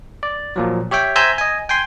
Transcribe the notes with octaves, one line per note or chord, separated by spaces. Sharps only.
D5
A#2 F3 F#3
G4 C#5 E5 G5
C5 E5 G#5 A#5 E6 G6
D#5 G#5
G5 G#5 C6